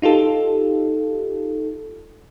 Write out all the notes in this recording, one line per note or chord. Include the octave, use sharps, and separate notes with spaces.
D#4 F4 G4 A4